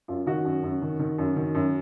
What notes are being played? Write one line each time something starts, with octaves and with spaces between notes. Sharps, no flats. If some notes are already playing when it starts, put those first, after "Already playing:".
F#2 F4
D#3 F#4
F#2
F#2
D#3
D#3
F#2
D#3
F#2